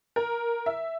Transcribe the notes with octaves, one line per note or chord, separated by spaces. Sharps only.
A#4
E5